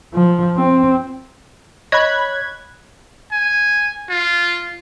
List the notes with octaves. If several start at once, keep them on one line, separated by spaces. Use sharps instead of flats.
F3
C4
C#5 D#5 B5 F#6 G#6
G#5
F4